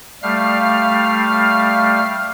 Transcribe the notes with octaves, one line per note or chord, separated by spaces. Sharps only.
G3 A3 F5 F6